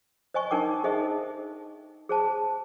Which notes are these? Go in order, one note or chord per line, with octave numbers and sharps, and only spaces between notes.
C5 D#5 G#5 C#6
D4 D#4 A#4 G5 D6
D#4 G#4 A4 C5 D#5 E5
G#4 C5 A5